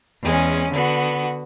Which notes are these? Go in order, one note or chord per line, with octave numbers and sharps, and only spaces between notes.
E2 G#3 C#4
D3 B3 F#4